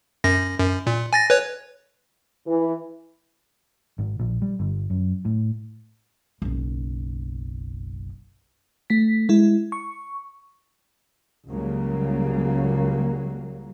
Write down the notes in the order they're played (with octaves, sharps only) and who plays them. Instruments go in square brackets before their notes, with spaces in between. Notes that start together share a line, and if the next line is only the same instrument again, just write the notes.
[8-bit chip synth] F#2 A#6
F#2
A#2
G#5 A6 A#6
B4 C#5
[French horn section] E3
[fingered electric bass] G#1
A#1
G3
G1
F#2
A2
[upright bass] F#1 B1
[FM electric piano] A3 B6
G#3 E4
C#6
[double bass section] C#2 C#3 F#3 G3 A#3